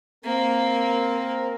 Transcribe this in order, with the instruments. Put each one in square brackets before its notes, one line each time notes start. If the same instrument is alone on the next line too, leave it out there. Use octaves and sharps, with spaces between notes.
[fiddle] A#3 [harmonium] C4 A#4